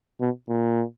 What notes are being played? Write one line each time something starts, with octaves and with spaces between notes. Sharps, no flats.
B2
A#2